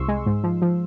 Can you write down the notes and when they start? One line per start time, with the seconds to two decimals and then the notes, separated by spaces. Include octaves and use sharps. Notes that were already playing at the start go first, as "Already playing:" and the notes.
Already playing: C2 C3 C6 C#6 E6
0.08 G#3
0.26 G#2
0.44 F3
0.62 F3